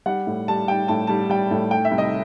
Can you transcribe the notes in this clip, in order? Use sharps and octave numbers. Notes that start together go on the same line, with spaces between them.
G3 F#5
A2
G3 A5
G3 G5
A2 A5
G3 A5
G3 G5
A2
A3 G5
E5
C2
D#5